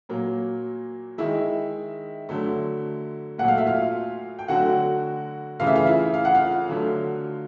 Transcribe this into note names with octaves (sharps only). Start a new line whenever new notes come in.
A#2 F#3 A#3
D#3 G#3 E4 E5
D3 F#3 A3
A#2 F#3 A3 F#5
F5
E5
F4 F5
G5
D3 F#3 A3 F#4 F#5
C#3 E3 A3 F5
E5
F4 F5
E4 E5
F5
F#5
F4 F5
D3 F#3 A3